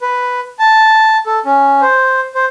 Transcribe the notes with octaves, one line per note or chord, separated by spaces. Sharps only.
B4
A5
A4
C#4
C5
C5